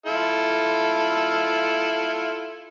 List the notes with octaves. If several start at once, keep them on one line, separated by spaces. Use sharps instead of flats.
E4 F4 A4